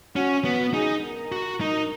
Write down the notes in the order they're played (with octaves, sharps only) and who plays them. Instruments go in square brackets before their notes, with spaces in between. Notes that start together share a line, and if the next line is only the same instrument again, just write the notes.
[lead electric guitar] C#4 [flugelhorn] F#4
[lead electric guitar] B3 [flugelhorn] F#4
[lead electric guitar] D#4 [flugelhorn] G#4
[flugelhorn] A#4
[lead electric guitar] F#4
D#4